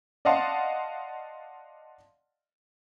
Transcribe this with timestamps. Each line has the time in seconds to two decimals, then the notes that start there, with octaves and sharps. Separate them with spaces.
0.25 D5 D#5 F5 F#5 A5 C6